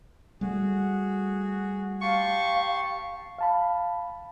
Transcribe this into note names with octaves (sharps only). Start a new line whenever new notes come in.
G3 A3 F#4 G#4
G4 F5 A5 C6 C#6
F5 A5 B5